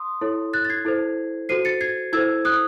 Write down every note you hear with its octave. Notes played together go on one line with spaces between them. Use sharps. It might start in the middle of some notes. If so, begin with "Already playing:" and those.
Already playing: C6 D#6
E4 A4 C#5
F#6 A6
A6
G#6 C7
E4 A4 C5
F#4 A4 C5 C7 D#7
A6 C#7
G#6 C7
E4 A4 C5 E6 G#6
D#6 F#6